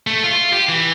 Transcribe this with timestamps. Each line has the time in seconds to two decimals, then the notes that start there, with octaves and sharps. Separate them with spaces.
0.07 A3
0.24 F4
0.53 G4
0.69 E3